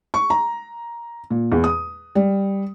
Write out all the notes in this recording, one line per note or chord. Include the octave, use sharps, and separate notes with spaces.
C#6
A#5
A#2
E2
D#6
G3